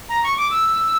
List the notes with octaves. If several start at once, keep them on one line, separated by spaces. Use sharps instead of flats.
A#5
C#6
D6
E6